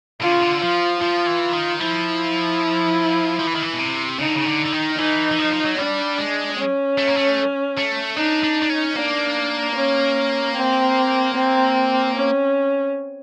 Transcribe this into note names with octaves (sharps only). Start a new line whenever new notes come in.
D3 F4
C#3
D3
F3 F4
F3 F4
E3
D#3
F3 E4
F3
E3
D#3
E3
B2
C3
C#3 D#4
D3
C#3
D3
D3
D#3
E3 D#4
E3
F3
F3
F#3
G3 D4
G#3
C#4
A3
A#3
A3
A3
D4 D#4
D4
D4
C#4
A#3 D4
C#4
C4
C4
C#4